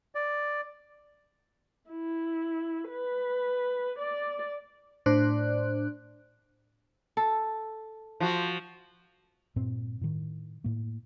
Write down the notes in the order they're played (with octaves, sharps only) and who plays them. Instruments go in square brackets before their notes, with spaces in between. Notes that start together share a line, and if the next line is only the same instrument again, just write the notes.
[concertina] D5
[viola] E4
B4
D5
[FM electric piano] A2 D4 C5 D5 F#6
[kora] A4
[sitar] F3 F#4
[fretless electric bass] G2 A#2 C4
A2 D#3
A2 A#3